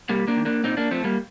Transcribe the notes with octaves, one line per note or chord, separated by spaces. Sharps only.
C3 G3 A#3
A#3 D4
D#3
A#3 D4
A#2 C4 D#4
A#3 D4
F3 A3 C4
G3 A#3